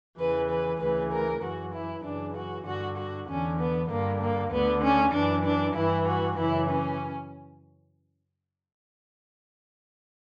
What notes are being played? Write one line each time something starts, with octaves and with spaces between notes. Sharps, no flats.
E2 C#3 E3 B4
B4
D2 C#3 E3 B4
A#4
F#2 E3 F#4
E4
F#2 C#3 E3 D4
F#4
G2 D3 F#4
F#4
E2 D3 C#4
B3
G2 D3 A#3
A#3
D2 D3 B3
C#4
F#2 E3 D4
D4
G2 E3 E4
F#4
F#2 C#3 E3 E4
C#4